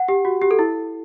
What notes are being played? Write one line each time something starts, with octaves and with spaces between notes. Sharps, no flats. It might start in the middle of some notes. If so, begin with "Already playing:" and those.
Already playing: F#5
G4
F#4
G4
A4
E4